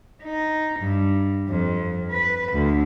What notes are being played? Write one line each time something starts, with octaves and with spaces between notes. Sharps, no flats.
D#4
G2
F2
B4
D2